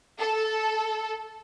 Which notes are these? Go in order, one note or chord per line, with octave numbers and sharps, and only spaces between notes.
A4